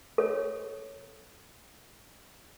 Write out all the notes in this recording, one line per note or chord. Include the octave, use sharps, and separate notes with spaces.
A4 C#5